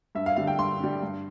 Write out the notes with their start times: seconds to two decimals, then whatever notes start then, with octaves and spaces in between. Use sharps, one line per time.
0.15 G2 E5
0.26 F5
0.36 D3 G3 F5
0.47 G5
0.58 G2 C6
0.80 D3 G3
1.02 G2